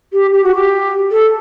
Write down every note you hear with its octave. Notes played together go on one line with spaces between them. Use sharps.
G4
G4
F#4
G4
A4